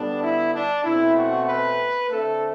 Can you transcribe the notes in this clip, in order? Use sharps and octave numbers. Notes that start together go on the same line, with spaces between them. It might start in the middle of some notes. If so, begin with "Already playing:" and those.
Already playing: D3 G3 B3 D4
E4
D4
B2 A3 C4 E4
F#4
B4
D3 A3 C4 A4